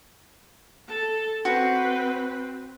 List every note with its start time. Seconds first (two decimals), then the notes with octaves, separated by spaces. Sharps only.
0.89 A4 A5
1.45 C4 F#4 B4